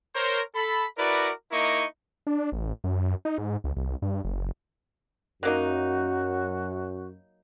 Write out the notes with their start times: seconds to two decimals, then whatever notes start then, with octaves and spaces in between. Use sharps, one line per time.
0.15 A#4 C5 C#5
0.55 A4 B5
0.98 E4 F#4 A#4 B4 D5
1.52 A#3 D#4 E4 A#4 D#5 C#6
2.27 D4
2.52 A1
2.84 F#2
3.25 D#4
3.38 G#2
3.64 C#2
3.77 C2
4.02 G2
4.24 F#1
5.43 F#2 F#3 A#3 D#4 F#4